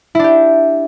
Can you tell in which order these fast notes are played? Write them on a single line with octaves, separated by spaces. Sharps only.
E4 D4 G4